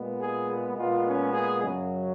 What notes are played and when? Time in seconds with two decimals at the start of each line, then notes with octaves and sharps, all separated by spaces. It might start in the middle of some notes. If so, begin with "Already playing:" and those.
Already playing: A#2 G#3 B3
0.19 G#4
0.76 A#2 G#3 B3 F4
1.05 C#4
1.34 G#4
1.62 F#2 C#3 F#3